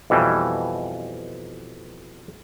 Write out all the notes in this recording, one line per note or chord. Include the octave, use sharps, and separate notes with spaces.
F2 B2 E3 G3